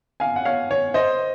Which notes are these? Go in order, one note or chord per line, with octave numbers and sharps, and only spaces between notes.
F5 G#5
F#5
C#5 F5
C#5
C5 D#5